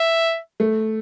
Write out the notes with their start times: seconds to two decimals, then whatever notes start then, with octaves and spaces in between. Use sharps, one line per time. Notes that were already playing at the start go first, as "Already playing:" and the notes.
Already playing: E5
0.60 A3